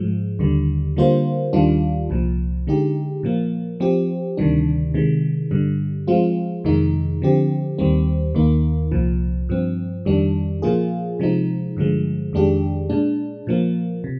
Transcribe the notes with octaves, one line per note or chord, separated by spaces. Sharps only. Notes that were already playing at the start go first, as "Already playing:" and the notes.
Already playing: G#2 F3 G#3
D#2 D3 G3
D3 G3 A#3 F4 C5
D#2 D#3 G3 D4 F4
C2 A#2 F3
D3 G#3 D#4 G4
A#2 F3 A#3
F3 C4 G4
D2 C3 D#3 G3 D4
C3 D#3 G#3
G2 D3 G3
F3 G#3 C4 F4
F2 C3 D#3 G#3 D#4
D3 F3 C4 G4
D#2 D#3 G3 C4
D#2 D#3 A#3 D#4
C2 A#2 F3
G2 F3 C4
F2 D#3 G3 D4
A#2 F3 A#3 F4 G#4
C3 F3 G#3 D#4
G2 D3 F3 G#3
F2 D#3 G#3 D4 G4
A#2 G#3 D4
A#2 F3 A#3
C3